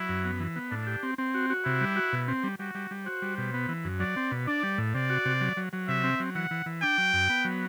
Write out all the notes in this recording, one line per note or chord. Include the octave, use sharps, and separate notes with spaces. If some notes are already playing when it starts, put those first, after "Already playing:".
Already playing: F#3 E4
F#2
B3
E3
B3
A2 D4
G4
C4
C4
F#4
F#4
C3 E4
G3
F#4
B2
C4
G3
G3 F#4
G3
G3
F#4 C5
G3
B2
B3
E3
F#2
F#3 D5
C4
B2
D4 D5
G3
A2
C3 D5
F#4
C3
F#3
F#3
F#3
C3 E5
C4
F#3
E3 F#5
E3
E3
D4 G5
F#3
F#2
B3
F#3